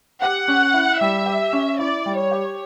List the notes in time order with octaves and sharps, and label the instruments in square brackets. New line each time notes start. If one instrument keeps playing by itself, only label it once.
[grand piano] G4 [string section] F#5
[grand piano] C#4
E4
[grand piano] G3 [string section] E5
[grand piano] G4
C#4
[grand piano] E4 [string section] D5
[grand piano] G3
[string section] C#5
[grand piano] G4